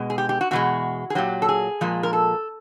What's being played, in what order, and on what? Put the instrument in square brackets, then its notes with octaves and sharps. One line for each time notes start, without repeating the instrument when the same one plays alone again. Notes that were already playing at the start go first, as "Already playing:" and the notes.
Already playing: [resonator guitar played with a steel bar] B2 G#3
G#4
G4
G4
F#4
E2 B2 G#3 F#4
G#4
A#2 F#3 G4
A4
G#4
A#2 F3 G#3
A#4
A4